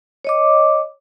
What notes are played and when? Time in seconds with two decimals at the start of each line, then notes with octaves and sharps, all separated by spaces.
0.25 C#5 D#5 D6